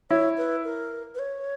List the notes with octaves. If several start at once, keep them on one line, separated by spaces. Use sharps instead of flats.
E4 C#5
B4
A#4
B4
C#5